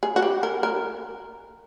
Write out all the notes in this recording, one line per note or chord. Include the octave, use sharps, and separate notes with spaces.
G#4
F#4
G4
A#4
A#4